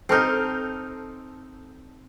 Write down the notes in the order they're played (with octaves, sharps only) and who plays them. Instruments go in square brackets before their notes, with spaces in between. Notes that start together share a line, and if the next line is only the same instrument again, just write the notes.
[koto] C4 D#4 [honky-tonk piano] A4 F6 G6